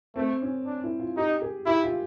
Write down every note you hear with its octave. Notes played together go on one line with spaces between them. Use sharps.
A3 C4
C#4
D4
E4
F4
D#4 G4
G#4
E4 G4
F4